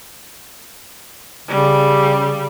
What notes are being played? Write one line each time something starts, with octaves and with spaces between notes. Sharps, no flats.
C#3 G3